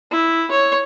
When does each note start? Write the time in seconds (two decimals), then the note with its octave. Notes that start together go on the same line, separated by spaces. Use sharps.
0.11 E4
0.51 C#5